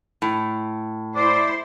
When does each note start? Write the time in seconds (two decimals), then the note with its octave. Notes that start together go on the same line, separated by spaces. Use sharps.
0.22 A2
1.15 E4 C5 D5